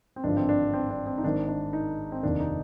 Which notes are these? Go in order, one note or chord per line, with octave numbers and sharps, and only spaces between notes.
C4
G#1 G2 D3 F3 D4
C4
D4
C4
D4
C4
D#4
G#1 G#2 D#3 D4
D4
D#4
C4
F1 D#2 D#3 D4
D#4